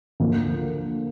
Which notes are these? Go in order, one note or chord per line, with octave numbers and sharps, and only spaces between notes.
D2 D3 F3 A#3